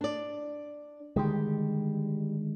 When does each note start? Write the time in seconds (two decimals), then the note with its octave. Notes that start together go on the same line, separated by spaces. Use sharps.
0.01 D4 D5
1.16 D3 D#3 G3 G#3 G4